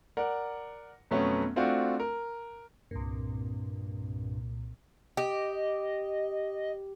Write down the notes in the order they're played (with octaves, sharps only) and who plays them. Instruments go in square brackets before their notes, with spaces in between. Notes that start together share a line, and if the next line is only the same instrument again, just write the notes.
[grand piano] A#4 D5 F#5
F2 B2 F#3 A3 B3 C#4
A3 C4 D4 F4 F#4
A#4
[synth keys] C2 A#2 [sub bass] G2
[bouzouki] G4 [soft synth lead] D#5